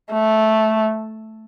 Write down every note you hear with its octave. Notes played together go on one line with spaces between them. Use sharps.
A3